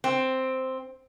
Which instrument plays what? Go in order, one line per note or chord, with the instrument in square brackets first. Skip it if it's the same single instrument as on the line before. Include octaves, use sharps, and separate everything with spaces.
[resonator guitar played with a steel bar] C4